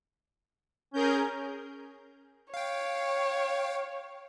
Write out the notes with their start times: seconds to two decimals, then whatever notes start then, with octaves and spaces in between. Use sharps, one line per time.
0.94 C#4 G#4 A#4 G6
2.54 C#5 F5 G5